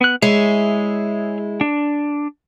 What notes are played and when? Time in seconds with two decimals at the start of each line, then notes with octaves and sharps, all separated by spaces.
0.01 B3 F#6
0.22 G#3 E4 G#4 C#5 E5
1.61 D4